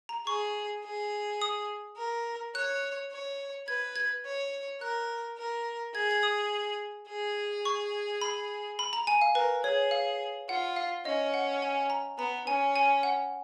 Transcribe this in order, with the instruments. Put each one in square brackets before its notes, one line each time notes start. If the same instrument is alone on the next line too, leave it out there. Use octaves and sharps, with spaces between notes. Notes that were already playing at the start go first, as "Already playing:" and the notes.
[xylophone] A#5
[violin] G#4 [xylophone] C#6
[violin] G#4
[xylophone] D#6
[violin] A#4
[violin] C#5 [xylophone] F#6
[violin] C#5
[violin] B4 [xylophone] G#6
[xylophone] G#6
[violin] C#5
[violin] A#4 [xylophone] F#6
[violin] A#4
[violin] G#4 [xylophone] G#6
[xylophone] G#6
D#6
[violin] G#4
[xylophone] C#6
B5
B5
A#5
G#5
F5
[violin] A#4 [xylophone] B4
[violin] G#4 [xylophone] C#5
[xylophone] F5
[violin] F4 [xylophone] F#5
[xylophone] F5
[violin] C#4 [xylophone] D#5
[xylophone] F#5
G#5
A#5
[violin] B3 [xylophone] A#5
[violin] C#4 [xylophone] G#5
[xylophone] G#5
F#5